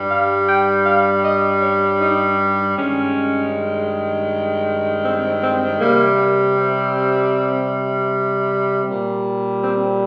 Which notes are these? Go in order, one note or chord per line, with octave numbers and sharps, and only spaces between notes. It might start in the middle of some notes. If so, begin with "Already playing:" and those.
Already playing: G2 G3
F5
G5
F5
D#5
C#5
D#4
G2 D#3 G#3 C#4
C4
C4
C3 G3 A#3
C4
A#2 G3
C4